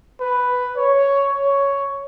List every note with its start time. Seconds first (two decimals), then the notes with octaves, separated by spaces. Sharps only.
0.20 B4
0.77 C#5
1.32 C#5